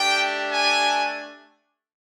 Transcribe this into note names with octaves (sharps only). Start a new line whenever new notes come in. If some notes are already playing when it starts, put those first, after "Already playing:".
Already playing: A3 D4 G4 G5
G#5